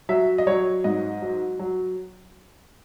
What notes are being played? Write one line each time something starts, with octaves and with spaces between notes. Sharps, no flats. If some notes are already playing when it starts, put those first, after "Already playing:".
F#3 E5
D#5
F#3 C#5
G#2 D#5
F#3
F#3